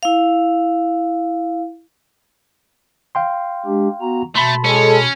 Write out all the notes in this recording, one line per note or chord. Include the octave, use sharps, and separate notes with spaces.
E4 F5
F5 G5 C6
G#3 D4 G4
B3 F#4 A#5
B2 A3 A5 B5 C6
G#3 C#4 A4